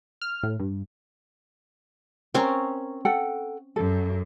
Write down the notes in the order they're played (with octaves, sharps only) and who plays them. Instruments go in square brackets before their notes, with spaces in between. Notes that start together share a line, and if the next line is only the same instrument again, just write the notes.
[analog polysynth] F6
A2
G2
[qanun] C4 C#4 [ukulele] A#4 A#5
[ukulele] A4 F#5 G5
[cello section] F#2 [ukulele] A4